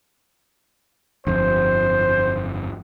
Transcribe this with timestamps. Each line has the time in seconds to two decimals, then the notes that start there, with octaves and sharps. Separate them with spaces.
1.27 G1 F2 C5